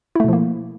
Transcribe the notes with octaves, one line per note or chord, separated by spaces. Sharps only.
B2 F3 A3 A#3 E4